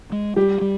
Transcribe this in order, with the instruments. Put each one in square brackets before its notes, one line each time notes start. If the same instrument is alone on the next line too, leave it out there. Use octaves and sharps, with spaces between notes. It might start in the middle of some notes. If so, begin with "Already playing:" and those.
[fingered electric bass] G#3
[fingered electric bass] G3 [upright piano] G4
[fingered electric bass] G3